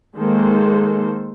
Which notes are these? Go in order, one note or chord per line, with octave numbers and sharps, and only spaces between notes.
D#3 G#3 A#3 A4 C5